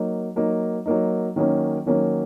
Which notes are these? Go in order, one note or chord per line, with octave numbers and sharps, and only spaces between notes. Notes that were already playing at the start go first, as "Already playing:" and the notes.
Already playing: F#3 A#3 D#4
F#3 A#3 D#4
F#3 A#3 D#4
D#3 F#3 A#3 C#4
D#3 F#3 A#3 C#4